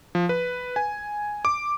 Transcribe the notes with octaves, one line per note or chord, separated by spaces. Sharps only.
F3
B4
G#5
D6